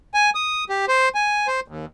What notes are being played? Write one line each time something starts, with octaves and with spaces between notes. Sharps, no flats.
G#5
D#6
G4
C5
G#5
C5
D#2